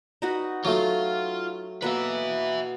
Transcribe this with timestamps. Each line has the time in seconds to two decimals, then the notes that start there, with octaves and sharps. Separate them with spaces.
0.22 D#4 F#4 B4
0.65 F#3 A3 F4
1.82 B2 A#3 B4 E5